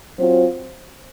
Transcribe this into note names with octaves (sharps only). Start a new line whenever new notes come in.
F#3 C4 F4 C5